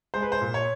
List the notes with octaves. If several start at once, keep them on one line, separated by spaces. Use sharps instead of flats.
G#3 C5
B4
C5
A#2
C#5